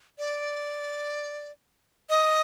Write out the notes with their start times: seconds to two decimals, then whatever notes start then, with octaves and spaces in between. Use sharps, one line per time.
0.18 D5
2.09 D#5